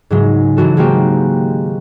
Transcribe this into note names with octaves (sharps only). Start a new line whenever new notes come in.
G#2 C#3 F#3 G#3
E3 F#3 F#4 A4
D#3 G#3 A#3 C4 F#4 G4